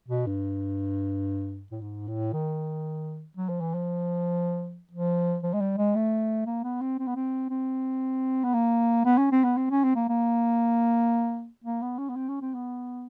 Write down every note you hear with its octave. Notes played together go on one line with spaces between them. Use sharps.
B2
G2
A2
G#2
A2
D#3
F#3
F3
E3
F3
F3
F3
G#3
G3
G#3
A3
A#3
B3
C4
C4
B3
C4
C4
B3
A#3
B3
C#4
C4
B3
C4
C#4
C4
A#3
A#3
A#3
B3
C#4
B3
C4
C#4
C4
B3